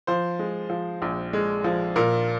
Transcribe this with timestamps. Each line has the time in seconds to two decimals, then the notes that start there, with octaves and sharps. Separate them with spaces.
0.07 F3 C5
0.39 G#3
0.70 F3
1.02 A#1
1.33 G#3
1.64 F3
1.96 A#2 A#4